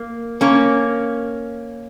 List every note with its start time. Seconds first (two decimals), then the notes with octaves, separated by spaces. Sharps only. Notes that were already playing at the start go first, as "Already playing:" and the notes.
Already playing: A#3
0.41 A#3 C#4